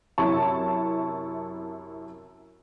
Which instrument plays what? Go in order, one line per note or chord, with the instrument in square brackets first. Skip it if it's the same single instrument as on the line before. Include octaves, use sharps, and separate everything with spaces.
[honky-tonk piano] F#2 C3 E4 A5 C#6